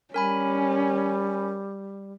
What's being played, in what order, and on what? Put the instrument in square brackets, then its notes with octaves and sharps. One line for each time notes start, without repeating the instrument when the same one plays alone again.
[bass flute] G3 [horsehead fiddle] C#4 [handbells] A#4 G#5 B5